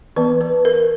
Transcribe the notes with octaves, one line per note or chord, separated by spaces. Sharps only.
E3 B3 B4
B4
A#4